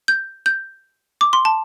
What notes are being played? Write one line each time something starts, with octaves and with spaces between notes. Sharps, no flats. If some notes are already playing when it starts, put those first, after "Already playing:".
G6
G6
D6
C6
A5